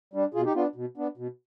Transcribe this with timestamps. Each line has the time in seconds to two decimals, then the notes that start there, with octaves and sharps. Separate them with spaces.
0.13 G3 D4
0.34 B2 F4 G#4
0.45 D#4 G4
0.55 B3 D4 F4
0.76 B2
0.97 B3 D4
1.17 B2